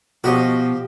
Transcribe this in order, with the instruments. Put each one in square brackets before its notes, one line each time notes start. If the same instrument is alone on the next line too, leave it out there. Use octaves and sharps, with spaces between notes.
[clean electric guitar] B2 [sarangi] F3 [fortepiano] F#4 D#5 [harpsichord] G4